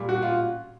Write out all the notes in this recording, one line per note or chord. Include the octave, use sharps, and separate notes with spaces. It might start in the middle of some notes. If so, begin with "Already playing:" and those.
Already playing: A#2 G3
F#4
F4